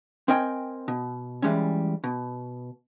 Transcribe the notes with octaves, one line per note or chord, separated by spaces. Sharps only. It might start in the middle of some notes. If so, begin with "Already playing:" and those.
C4 A#4 D#5 G5 G#5
B2
E3 G3 G#3 C#4
B2